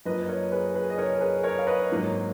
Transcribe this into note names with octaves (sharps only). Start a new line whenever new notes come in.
F#2 F3 A#3 B4 D#5
A#4 C#5
G#4 B4
G#4 B4
D#5
A#4 C#5
A#4
G#4 B4
A#4 C#5
F5
B4 D#5
G#2 F#3 A#3